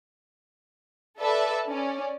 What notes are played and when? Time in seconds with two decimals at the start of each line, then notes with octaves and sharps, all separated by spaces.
1.18 A4 B4 D5 E5 A5
1.69 C#4 D5